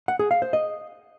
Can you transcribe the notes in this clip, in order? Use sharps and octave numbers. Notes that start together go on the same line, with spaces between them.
F#5
G#4
F5
C5
D#5